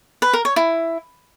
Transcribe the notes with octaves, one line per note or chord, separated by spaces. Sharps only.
B4
A#4
C#5
E4